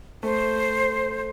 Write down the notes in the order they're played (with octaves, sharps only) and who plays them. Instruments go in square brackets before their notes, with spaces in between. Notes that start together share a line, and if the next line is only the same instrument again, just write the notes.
[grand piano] A3 [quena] C5